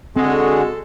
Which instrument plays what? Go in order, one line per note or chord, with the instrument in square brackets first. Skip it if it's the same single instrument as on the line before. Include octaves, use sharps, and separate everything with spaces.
[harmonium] D3 F#4 G#4 [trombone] G#3 [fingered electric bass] C4 [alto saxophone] A4